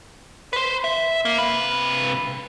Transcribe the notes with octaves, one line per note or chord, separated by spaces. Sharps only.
B4 C5
E5
A#3
C3 B4